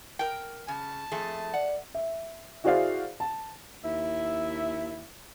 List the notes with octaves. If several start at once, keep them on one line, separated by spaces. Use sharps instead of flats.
A#4 G5
C#3 A5
F2 A3 G#4
D5 F#5
E5
E4 F#4 G#4 C5 D5 F5
A5
D#2 E4 E5